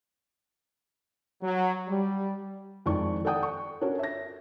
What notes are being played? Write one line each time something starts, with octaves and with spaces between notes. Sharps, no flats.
F#3
G3
F2 D#3 G#3 E4 D5 C#6
A4 D5 F#5 G5 D#6
C#6
C#4 D4 F#4 A4 A#4 C#5
E5 A#6